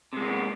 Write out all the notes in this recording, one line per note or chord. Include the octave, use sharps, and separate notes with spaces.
C3 G#3 A#3 B3